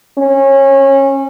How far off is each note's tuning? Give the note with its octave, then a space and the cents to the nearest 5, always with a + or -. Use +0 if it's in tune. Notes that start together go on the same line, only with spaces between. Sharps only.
C#4 -25